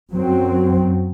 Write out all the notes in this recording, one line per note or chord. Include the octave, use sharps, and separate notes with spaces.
F#2 F#3 C4